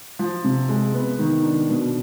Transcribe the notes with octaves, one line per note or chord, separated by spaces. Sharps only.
F3
C3
G#3
B3
D#3
D4
B2